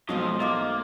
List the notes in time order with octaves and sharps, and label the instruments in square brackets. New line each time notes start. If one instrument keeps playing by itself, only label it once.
[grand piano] B1 [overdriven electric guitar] F3 D#5 [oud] G#3 F4 C5
[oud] A3 D#4 [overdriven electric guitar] A#3 [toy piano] D#5 C6 D6